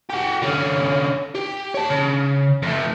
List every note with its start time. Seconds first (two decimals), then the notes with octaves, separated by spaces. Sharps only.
0.10 F#4 G4
0.42 D3 C#4
1.35 G4
1.74 C#5 A5
1.90 C#3
2.62 F2 A3